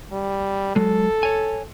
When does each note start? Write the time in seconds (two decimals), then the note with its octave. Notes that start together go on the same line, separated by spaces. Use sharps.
0.12 G3
0.76 F#3 G#3 A4
1.23 C#5 G#5